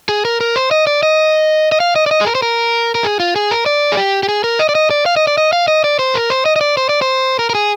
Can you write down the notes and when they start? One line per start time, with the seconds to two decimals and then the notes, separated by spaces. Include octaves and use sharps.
0.09 G#4
0.25 A#4
0.41 A#4
0.56 C5
0.71 D#5
0.87 D5
1.03 D#5
1.72 D#5
1.80 F5
1.96 D#5
2.06 D5
2.11 D#5
2.21 G#4
2.26 A#4
2.35 C5
2.42 A#4
2.95 A#4
3.04 G#4
3.20 F4
3.36 G#4
3.51 A#4
3.66 D5
3.92 G#4
3.97 G4
4.23 G4
4.29 G#4
4.44 A#4
4.59 D#5
4.69 D5
4.75 D#5
4.90 D5
5.06 F5
5.16 D#5
5.27 D5
5.38 D#5
5.53 F5
5.68 D#5
5.84 D5
5.99 C5
6.15 A#4
6.30 C5
6.46 D#5
6.56 D#5
6.61 D5
6.77 C5
6.89 D5
7.02 C5
7.39 A#4
7.50 A#4
7.55 G#4